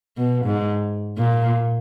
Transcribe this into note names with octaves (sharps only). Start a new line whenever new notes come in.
B2
G#2
A#2